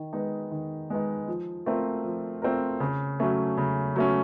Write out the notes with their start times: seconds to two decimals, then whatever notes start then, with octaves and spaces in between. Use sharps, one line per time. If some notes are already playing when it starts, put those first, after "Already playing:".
Already playing: D#3
0.13 G#3 B3 D#4
0.51 D#3
0.90 G#3 B3 D#4
1.28 F3
1.66 A3 C4 F4 A#4
2.05 F3
2.42 A3 C4 F4 A#4
2.80 C#3
3.20 F#3 A3 C#4
3.57 C#3
3.96 F#3 A3 C#4